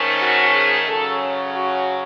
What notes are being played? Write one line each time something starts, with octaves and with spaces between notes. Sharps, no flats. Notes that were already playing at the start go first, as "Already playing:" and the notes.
Already playing: G#2 D#3 A3 C#4
F#4
G#4
C#3 F#3 C#4 A4
F#4